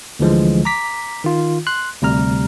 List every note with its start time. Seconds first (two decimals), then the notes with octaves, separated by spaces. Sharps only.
0.19 D2 D3 E3 F3 G#3
0.65 A#5 D6 B6
1.24 D#3 F4
1.67 C6 F#6
2.02 D2 C3 G3 A#5 F6